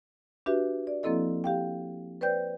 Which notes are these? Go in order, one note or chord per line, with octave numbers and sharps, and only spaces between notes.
D4 F#4 G4 B4 E5
D5
F3 A#3 C4 E4 A4 D#5
G4 F5 G5
B4 C5 D5 G5 G6